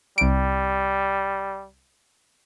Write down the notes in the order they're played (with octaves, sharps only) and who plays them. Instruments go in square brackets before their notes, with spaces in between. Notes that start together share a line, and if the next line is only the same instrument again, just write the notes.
[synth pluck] C2 D7 [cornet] G3